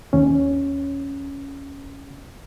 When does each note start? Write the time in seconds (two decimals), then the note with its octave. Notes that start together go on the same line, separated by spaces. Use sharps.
0.13 D#2 C#4